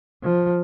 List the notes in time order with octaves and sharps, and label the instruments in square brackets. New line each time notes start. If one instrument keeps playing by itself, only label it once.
[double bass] F3